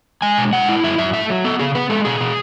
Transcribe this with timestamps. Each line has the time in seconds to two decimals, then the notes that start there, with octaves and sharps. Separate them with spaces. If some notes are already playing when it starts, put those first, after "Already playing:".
0.22 G#3 G#5
0.38 B2
0.53 G#3 F#5
0.69 E4
0.83 F#2 E5
0.98 F#2 E5
1.13 A3 E5
1.30 F#3
1.44 B3 A4
1.59 C#3 G#4
1.75 B3 B4
1.90 G#3 A4
2.05 B2 G#4
2.21 B2